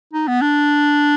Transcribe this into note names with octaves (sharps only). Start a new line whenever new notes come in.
D#4
B3
D4